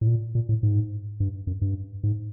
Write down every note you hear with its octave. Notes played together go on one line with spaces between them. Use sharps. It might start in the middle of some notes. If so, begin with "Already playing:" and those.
A2
A#2
A#2
A2
G#2
G2
F#2
G2
G#2